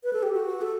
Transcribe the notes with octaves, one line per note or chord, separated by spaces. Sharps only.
B4
A4
G4
F#4
A4